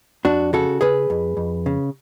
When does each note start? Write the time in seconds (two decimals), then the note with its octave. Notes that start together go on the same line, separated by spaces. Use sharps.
0.25 F2 D4 F#4
0.53 C#3 F#4 A4
0.81 C#3 G#4 B4
1.10 F2
1.37 F2
1.66 C#3